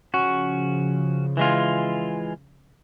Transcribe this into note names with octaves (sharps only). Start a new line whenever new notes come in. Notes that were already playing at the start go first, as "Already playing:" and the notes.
C#3 F3 C#4 F#4
E3 G#3 F4